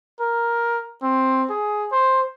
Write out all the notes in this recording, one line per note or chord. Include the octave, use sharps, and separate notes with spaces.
A#4
C4
G#4
C5